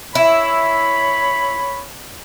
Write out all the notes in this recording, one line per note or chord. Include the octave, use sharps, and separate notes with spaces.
E4 C#5 B5